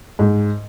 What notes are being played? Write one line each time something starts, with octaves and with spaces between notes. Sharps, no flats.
G#2